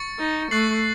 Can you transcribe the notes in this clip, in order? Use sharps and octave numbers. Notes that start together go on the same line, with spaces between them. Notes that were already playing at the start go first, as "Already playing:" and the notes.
Already playing: C#6 A6 C#7
D#4
A3 C#6 F#6 A6 C7 F#7